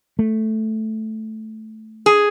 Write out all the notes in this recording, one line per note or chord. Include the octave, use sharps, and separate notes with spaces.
A3
G#4